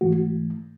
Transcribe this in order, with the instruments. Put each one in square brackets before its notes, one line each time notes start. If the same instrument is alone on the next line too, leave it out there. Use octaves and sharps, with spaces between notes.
[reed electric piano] G#2 E3 A3 F#4